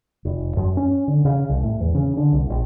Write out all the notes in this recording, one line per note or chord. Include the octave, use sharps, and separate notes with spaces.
F1
F#2
C#4
D3
C#3
C2
A2
E2
C#3
D3
C2
A#1